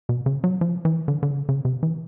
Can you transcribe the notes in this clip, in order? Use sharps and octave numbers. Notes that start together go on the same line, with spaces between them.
B2
C#3
F#3
F3
E3
D3
D3
C#3
C#3
C3
E3